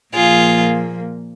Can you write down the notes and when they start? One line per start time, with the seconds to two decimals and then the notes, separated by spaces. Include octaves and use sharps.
0.14 A#2 F3 A#3 F4 G#4